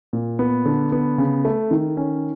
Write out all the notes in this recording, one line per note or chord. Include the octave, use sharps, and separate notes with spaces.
A#2
B3
D3
B3
C#3
A3
D#3
C#4